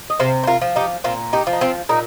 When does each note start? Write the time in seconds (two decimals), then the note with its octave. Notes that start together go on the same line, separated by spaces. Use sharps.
0.10 D#5
0.20 C3 C5 F5
0.44 C5
0.47 F4 A#4
0.62 F3
0.76 D#4 G4
1.04 A#2 C4 F4
1.33 D#4 G4
1.47 F3
1.53 D#4
1.61 C4 F4
1.89 A#2 A#3 D#4